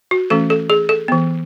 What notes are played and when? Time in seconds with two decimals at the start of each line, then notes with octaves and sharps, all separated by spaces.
0.11 F#4
0.30 E3 A3 C#4 A4
0.50 A4
0.70 G#4
0.89 A4
1.08 E3 B3